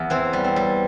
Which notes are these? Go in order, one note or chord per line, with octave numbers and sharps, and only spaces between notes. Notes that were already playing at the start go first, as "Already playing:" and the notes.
Already playing: E2
E3 C4
G3
C4
G3